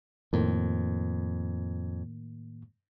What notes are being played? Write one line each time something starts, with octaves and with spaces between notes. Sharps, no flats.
F2 A2 D#3 A#3